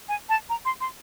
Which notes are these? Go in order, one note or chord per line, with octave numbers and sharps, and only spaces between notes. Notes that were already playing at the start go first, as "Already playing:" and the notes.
G#5
A5
A#5
C6
C6